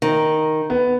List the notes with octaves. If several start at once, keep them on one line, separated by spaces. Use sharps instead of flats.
D#3
B3